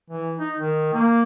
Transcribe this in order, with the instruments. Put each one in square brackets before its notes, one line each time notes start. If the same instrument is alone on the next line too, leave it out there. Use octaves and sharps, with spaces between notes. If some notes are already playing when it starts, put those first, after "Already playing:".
[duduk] E3
D#4
D#3
A#3